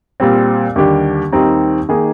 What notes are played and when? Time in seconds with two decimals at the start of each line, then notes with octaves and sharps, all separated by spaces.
0.20 A#2 G3 C4
0.76 D#2 D3 G3 D4 G4
1.32 D#2 D#3 G3 C4 D#4
1.89 D#3 A#3 D#4 G#4